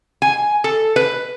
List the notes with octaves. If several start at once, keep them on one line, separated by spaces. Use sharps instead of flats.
G#5
A4
B4